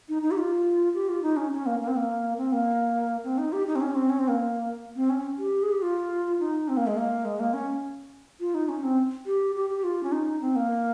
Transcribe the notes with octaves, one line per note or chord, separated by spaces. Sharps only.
D#4
D#4
G4
F4
G4
F4
D#4
C#4
C#4
A#3
A#3
C4
A#3
C4
A#3
C4
D#4
G4
D#4
C4
C#4
C4
C#4
C4
A#3
C4
C#4
G4
G#4
G4
F4
D#4
C4
A#3
G#3
A#3
G#3
A#3
C#4
F4
D#4
C#4
C4
G4
G4
G4
F4
C#4
D#4
C4
A#3